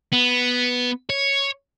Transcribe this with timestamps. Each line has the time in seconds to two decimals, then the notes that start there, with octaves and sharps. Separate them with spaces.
0.13 B3
1.10 C#5